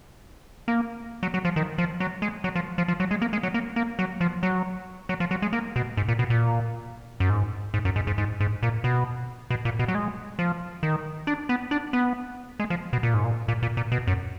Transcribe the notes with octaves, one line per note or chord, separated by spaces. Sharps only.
A#3
F#3
F#3
F3
D#3
F3
F#3
G#3
F#3
F3
F3
F3
F#3
G#3
A#3
G#3
F#3
A#3
A#3
F#3
F3
F#3
F#3
F3
F#3
G#3
A#3
B2
G#2
A#2
B2
A#2
F#2
G#2
G#2
F#2
G#2
G#2
G#2
G#2
A#2
B2
B2
A#2
B2
F#3
G#3
F3
D#3
D4
B3
D4
B3
G#3
F3
B2
A#2
G#2
A#2
A#2
A#2
A#2
B2
F#2